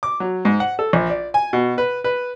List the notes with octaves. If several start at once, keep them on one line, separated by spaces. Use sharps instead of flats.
D6
F#3
G#2
F#5
A4
A#1
D5
G#5
B2
B4
B4